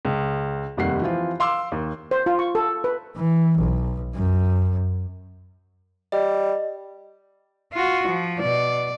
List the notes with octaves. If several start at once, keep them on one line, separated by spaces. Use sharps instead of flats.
C#2
F1 D#2 G3 F#5 C7
E3 F3 C4 F4
F5 C6 D6 E6
D#2
C5
F4
C#6
A4
B4
E3
B1
F#2
G3 D#5
F4 F#4
F3
B2 D5